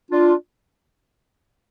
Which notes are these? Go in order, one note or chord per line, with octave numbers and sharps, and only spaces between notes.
D4 F4